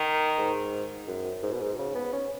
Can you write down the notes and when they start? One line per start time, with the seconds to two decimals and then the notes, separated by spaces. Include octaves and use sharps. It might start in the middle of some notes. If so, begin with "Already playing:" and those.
Already playing: D#3
0.38 G#2
1.07 F#2
1.43 G#2
1.53 B2
1.61 G#2
1.79 C#3
1.95 B3
2.13 C#4